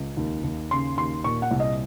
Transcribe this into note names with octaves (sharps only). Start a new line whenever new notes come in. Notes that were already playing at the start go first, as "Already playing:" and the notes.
Already playing: C#2
D#2
D#2
C#3 C6
D#2 C6
A#2 C#6
F#5
C2
D#5